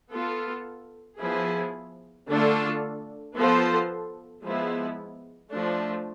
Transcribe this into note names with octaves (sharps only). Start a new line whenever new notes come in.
B3 F4 A4
F3 B3 E4 G#4
D3 A3 D4 F4 A4
F3 B3 F4 A4 C5
F3 G#3 B3 E4
F3 A3 D4